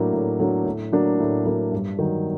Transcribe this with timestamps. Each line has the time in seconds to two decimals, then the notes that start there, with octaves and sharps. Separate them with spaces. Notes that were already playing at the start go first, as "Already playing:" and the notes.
Already playing: A2 F#3 A#3 D4
0.13 A2
0.40 F#3 A#3 D4
0.65 A2
0.92 F#3 A#3 D4
1.19 A2
1.45 F#3 A#3 D4
1.72 G2
1.99 D#3 F#3